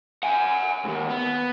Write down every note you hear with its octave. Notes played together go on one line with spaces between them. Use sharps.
F#5 G#5
D#2 G#2
B3